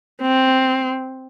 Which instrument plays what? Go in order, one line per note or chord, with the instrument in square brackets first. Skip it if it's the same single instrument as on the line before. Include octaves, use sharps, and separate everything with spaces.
[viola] C4